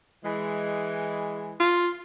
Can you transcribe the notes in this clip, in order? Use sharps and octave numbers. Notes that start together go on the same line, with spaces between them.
E3 G#3
F4